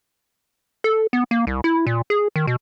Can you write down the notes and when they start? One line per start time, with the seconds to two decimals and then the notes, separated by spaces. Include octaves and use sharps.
0.84 A4
1.13 B3
1.31 A#3
1.47 C2
1.64 E4
1.87 A#2
2.10 G#4
2.36 D#3
2.47 B2